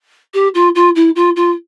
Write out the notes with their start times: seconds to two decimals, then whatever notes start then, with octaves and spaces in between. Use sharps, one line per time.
0.34 G4
0.54 F4
0.75 F4
0.96 E4
1.16 F4
1.36 F4